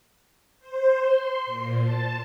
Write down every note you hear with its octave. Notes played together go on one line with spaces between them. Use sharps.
C5
C6
A#2
A5